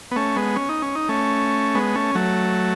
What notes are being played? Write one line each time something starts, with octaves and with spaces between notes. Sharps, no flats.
B3
A3 C#4
G#3 B3
C#4
D#4
C#4
D#4
A3 C#4
G#3 B3
A3 C#4
F#3 A3